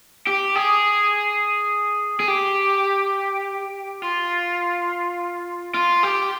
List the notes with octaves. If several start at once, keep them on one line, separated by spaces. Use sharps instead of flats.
G4
G#4
G#4
G4
F4
F4
G4